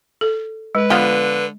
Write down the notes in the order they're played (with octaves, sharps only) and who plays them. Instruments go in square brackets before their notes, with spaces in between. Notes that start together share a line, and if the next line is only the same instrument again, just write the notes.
[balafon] A4
[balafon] G#3 [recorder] B4
[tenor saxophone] D3 [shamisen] F3 B3 F4